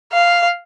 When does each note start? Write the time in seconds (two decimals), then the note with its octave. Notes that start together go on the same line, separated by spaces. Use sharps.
0.12 F5